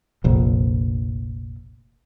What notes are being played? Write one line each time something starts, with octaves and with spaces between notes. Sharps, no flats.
F1 A#1